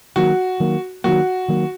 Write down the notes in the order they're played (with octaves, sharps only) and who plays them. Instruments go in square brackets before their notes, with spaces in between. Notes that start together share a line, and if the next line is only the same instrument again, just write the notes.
[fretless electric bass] D#3 F#3 A#3 [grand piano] F#4
[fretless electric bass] D#3 F#3 A#3
[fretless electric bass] D#3 F#3 A#3 [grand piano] F#4
[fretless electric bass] D#3 F#3 A#3